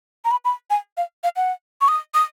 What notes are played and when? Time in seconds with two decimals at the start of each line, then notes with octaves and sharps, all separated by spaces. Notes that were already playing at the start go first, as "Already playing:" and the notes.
0.25 A#5
0.31 B5
0.45 B5
0.70 G#5
0.97 F5
1.23 F5
1.36 F#5
1.81 C#6
1.88 D#6
2.14 D#6